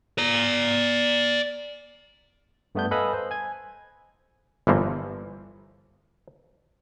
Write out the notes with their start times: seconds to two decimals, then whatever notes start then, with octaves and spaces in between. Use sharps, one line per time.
0.18 D5 A#5
2.75 G2 A3 B3 D4 G6
2.91 A4 B4 D#5 F5 G#5 B5
3.13 C5
3.31 G#5 G#6
4.67 G1 E3 F3 A#3